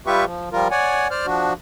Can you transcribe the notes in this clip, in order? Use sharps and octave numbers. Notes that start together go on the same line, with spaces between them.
G3 F4 G4 B4 E5 C#6
F3
F3 G3 F4 A#4
C#5 D5 F#5 G#5
C5 D5 F6
F3 D4 F#4